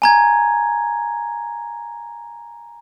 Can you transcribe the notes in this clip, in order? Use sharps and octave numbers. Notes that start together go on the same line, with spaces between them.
G#5 A#5 G#6